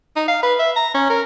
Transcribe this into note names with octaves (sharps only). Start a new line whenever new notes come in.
D#4
F5
B4
E5
A#5
C#4
A#4